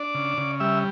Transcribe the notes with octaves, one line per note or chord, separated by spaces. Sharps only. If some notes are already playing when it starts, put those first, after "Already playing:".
Already playing: D4 D5
C#3
C#3
G3 E5